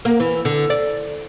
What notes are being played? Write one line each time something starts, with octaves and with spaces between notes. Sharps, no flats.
A#3
E3
D3
D5